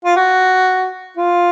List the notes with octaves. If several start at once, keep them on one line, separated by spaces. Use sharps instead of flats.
F4
F#4
F4